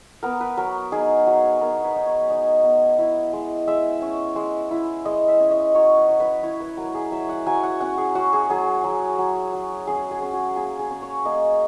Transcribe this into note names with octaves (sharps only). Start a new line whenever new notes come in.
B3 A#4
B4
F#3 A#4
D#4 G#4
F#3
B3 A#4
B4
D#4
C#5
D#4 D#5
B3
E4
G#3
G#3 E5
C#4
G#3
E4
G#3 D#5
E5
C#4
D#5
F#3 C#5
B4
F#3
B4
E4 C#5
B4
F#3 A#4
G#4
F#3 E5
F#5
F#3 G#5
F#5
C#4 F#5
G#4
C#4 F#4
G#4
F#3 G#4
F#3
F#3
F#3
C#4 G#4
G#4
C#4
F#4
A#3 G#4
G#4
C#4
C#5
A#3 D#5